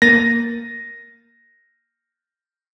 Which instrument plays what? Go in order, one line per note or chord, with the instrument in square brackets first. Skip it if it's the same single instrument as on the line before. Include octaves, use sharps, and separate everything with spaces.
[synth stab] A#3 A6 D#7 [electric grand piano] A#6